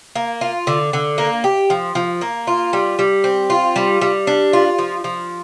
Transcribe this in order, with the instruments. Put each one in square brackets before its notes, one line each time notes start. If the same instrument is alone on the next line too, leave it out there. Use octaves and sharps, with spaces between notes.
[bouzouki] A#3
F4
D3
D3
A#3
G4
F3
F3
A#3
F4
G3
G3
C4
F4
G3
G3
D4
F4
F3
F3